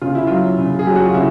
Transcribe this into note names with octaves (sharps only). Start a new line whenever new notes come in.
C#3 F4
E4
F#3 F4
C#3
G#4
F#3 G4
F#4
F4
C#3 E4